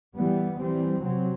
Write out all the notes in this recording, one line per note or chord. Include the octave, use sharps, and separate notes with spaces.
E3 G3 B3
E3 G3 C4
C3 F#3 C4